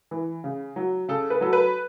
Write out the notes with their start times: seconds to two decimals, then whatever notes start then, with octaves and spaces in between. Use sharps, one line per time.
0.11 E3
0.44 C#3
0.76 F#3
1.08 C#3 A4
1.30 B4
1.41 F#3 A4
1.53 B4